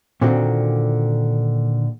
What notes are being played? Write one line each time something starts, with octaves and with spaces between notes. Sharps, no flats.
A#2 D3 D#3 C4 F#4